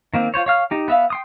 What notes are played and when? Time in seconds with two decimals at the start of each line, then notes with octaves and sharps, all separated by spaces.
0.14 D#3 A#3 C4
0.34 F4 C5 C#5
0.46 C#5 F5 F6
0.71 D#4 G4
0.88 B3 E5 F5
1.10 G5 C6 D#6